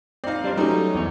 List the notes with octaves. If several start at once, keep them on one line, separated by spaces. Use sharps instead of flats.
C4 D#4 D5 F5
G3 D4 C5
F#3 G3 A3 C#4 D#4
E2 C#5